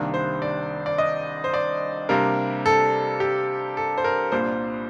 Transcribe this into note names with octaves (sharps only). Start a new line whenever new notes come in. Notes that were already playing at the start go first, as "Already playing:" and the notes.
Already playing: C2 C3 D#3 A#3 D4
C5
D5
D5
D#5
C5
D5
C3 G3 A#3 D4 A#4
A4
G4
A4
C5
A#4
C2 A#2 G3 A#3 D4 C5